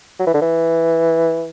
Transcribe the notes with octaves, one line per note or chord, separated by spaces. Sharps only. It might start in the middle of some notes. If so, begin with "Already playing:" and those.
F#3
E3
D3
E3